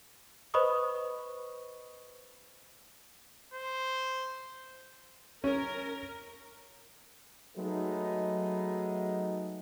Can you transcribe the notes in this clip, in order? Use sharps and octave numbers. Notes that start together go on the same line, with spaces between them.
B4 C5 D#5 B5 C#6 D#6
C5
C#4 A#4
F#3 G#3 A3 B3 D#4